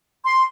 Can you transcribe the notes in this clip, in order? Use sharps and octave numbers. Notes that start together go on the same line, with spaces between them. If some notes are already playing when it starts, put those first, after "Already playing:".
C6